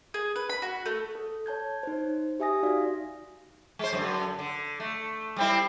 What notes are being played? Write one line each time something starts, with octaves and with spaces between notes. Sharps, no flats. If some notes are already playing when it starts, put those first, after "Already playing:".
G#4
B4
B5
F#4
A3
A4
C#5 A5 G6 G#6
D#4 C5
G4 E5 G#5 D#6 A#6
D#4 F#4 D5 F5
G#3 C5
F#2 D3
D3
A3
G3 C4 E4